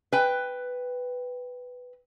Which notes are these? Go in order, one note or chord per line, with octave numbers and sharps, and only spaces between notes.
B4 G5